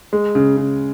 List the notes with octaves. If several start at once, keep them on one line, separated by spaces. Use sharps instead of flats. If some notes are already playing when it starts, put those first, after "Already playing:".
G#3
C#3
C#3